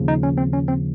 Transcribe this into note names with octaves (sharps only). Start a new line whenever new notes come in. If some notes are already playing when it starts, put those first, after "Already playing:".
Already playing: D#2 C#3 F3
D#4
C#4
C4
C#4
C4